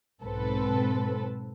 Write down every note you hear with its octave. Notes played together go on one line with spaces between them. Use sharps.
B1 G#2 C4 A4 B4